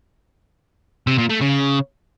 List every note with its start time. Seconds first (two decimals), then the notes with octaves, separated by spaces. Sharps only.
1.07 C3
1.18 A#2
1.29 A3
1.41 C#3